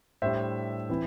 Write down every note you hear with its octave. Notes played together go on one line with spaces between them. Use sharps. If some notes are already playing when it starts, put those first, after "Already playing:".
A2 G3 D4 C5 E5
E3 C4 E4